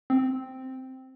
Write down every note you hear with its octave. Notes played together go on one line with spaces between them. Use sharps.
C4